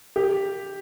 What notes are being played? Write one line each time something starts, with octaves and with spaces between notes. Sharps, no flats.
G4